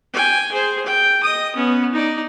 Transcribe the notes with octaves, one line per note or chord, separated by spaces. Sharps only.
G5 G#5
G#4 C5
G5
D#5 D#6
B3 C#4
D#4 D5